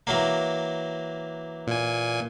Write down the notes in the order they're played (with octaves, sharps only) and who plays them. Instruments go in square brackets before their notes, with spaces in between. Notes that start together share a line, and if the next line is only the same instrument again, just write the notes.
[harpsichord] E3 F#3 A#3
[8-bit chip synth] A#2 G#5